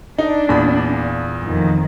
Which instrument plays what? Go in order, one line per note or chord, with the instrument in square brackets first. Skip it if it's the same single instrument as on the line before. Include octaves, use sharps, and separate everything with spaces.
[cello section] D4 [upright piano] D#4
[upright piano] E2 A#2 B5
[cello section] F2 D#3